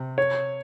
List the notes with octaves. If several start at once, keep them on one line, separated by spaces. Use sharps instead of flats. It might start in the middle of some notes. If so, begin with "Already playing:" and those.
Already playing: C3
C#5